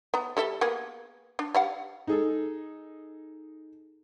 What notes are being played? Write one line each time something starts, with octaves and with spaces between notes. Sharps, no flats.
B3 A#5
G3 A4 E5
A#3 B3 G#4
D4
G3 F5 F#5
D#4 G#4 A4